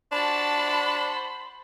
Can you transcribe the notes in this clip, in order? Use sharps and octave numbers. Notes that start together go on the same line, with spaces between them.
D4 F#4 C5 A5 B5